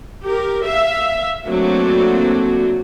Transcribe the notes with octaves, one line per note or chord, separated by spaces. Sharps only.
G4 A#4
E5 F5
F#3 A3 A#3 C4 D4 F#4